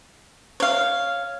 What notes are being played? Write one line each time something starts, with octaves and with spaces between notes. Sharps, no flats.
C#5 F5